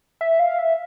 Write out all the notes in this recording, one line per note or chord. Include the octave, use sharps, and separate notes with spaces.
E5
F5
E5